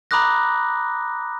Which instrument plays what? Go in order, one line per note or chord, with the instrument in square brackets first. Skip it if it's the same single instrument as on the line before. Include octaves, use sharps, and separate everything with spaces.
[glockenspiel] A#5 B5 D6 D#6 F#6 A#6